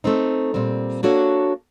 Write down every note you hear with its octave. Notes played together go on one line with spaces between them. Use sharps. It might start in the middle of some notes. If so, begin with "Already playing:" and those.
A3 C4 D#4
A#2 G3 C4
A#3 D4 F#4 A4 C#5